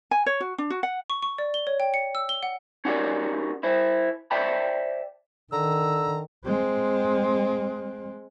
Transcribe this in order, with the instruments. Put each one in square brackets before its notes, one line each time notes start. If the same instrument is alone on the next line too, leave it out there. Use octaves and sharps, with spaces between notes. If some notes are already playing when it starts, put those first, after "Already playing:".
[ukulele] G#5
C#5
F#4
D4
F#4
F#5
[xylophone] C#6
C#6
D5
G7
C#5
G5
C#7
E6
G7
F#5
[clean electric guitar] C#4 D#4 F#4 G4 A#4 D5
E4 C5
C5 D5 E5 G5 A5 B5
[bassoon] D3 [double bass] D#3 [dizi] A#5 [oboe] E6
[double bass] G#3 C4